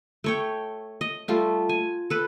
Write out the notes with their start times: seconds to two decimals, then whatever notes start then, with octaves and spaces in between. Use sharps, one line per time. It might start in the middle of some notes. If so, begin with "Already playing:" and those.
0.24 A3 C#5 G5
1.01 D#5
1.28 G3 A3 F4
1.69 G#5
2.10 A4 B4